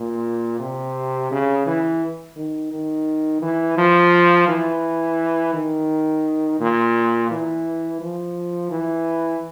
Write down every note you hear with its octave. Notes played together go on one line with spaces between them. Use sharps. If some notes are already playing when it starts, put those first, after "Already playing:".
Already playing: A#2
C3
C#3
E3
D#3
D#3
E3
F3
E3
D#3
A#2
E3
F3
E3